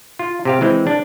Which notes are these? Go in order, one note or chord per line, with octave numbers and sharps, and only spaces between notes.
F4
C3 G4 F5
E3 G#3 C4
D4